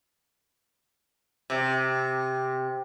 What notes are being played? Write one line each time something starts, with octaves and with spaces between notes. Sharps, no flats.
C3